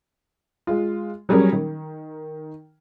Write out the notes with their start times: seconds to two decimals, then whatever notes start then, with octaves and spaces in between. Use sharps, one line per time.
0.67 G#3 F4
1.29 F#3 G3 C#4 G#4 A#4
1.52 D#3